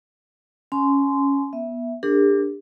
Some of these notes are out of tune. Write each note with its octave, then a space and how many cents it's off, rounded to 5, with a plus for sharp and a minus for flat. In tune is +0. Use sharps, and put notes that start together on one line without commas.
C#4 +0 G#5 +25 C6 -15
B3 -25 E5 +0
D4 +0 G4 +40 A#4 -35